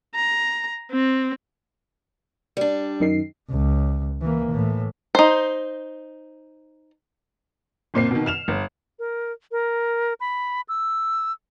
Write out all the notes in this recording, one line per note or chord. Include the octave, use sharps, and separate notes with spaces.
A#5
C4
G3 D4
F#2 D#3 C7
C#2
E3 A#3
A2 E3
D#4 C5
F#1 A#2 C4 C7
B2 D#3
F6 E7 F7
G1
A#4
A#4
B5
E6